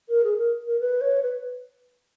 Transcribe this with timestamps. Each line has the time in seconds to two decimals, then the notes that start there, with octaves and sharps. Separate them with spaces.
0.09 A#4
0.24 G#4
0.37 A#4
0.66 A#4
0.80 B4
1.01 C#5
1.22 B4